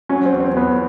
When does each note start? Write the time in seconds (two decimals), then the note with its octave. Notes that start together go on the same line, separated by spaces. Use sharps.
0.09 F#3 C#4
0.26 C4
0.33 E2
0.40 C4
0.56 E2 B3